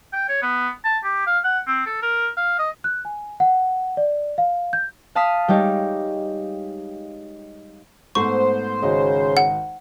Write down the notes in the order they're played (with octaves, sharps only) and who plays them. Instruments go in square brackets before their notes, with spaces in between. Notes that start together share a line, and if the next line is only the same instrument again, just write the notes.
[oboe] G5
C#5
B3
A5
G4
F5
F#5
C4
A4
A#4
F5
D#5
[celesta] F#6
G#5
F#5
D5
F5
G6
[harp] F5 A5 D#6 F6 B6
G3 G#3 D#4 G4 C#5
[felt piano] G#2 A3 B3 [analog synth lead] C5 [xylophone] C#6
[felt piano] G#1 F#4 D#5 [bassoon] C#3
[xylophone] F#5